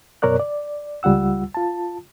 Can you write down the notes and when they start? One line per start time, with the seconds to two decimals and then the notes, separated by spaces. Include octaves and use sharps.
0.22 F#2 B2 A#4 C#5 D5 F#6
0.40 D5
1.03 C#2 G3 F4 F#5 E6
1.54 F4 A5